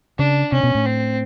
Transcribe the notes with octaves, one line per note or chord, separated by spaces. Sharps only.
C#3 D4
C3 C#4
B2
A2
C4